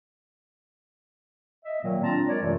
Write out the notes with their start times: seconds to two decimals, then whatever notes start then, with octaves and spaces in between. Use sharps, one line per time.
1.65 D#5 E5
1.82 A#2 D#3 F#3 A#3
2.03 C4 D4 F4 A5 A#5
2.28 G#3 A#4 C#5 D5
2.41 F#2 C3 E3 F#3 A3 F4